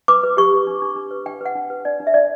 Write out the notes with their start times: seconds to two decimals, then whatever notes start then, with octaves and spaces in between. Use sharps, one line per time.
0.08 B4 D6
0.23 B4
0.37 G4 C#6
0.52 G4
0.67 D4
0.82 D4
0.96 D4
1.11 B4
1.26 D4 G5
1.41 B4 F#5
1.55 D4
1.70 B4
1.85 D4 D5
2.00 D4
2.07 E5
2.14 D4 D5